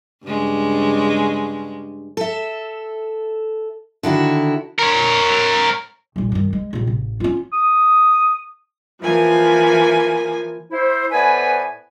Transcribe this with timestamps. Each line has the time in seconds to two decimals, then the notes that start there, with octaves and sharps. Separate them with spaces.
0.25 G2 C#3 G#3
2.17 A4 E5
4.03 D3 D#3 E4 F#4
4.79 A#4 C#5
6.16 D#1 A#1
6.32 G2 D#3
6.53 G#3
6.73 A#1 C3
6.87 A1
7.20 C#4 F4
7.53 D#6
9.01 E3 F3 A#3 G#5
10.71 E4 C5
11.11 A2 B3 B4 C5 D5 G#5